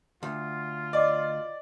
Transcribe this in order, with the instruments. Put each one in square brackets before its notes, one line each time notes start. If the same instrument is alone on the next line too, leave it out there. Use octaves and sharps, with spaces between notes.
[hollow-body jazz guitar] D2 [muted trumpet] F4
[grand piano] D5 [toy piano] D#5 D6